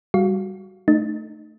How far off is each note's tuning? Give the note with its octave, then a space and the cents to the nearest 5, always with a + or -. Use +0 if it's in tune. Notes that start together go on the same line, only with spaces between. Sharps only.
G3 +0 F#4 +0 F5 +0
A3 +0 D#4 -30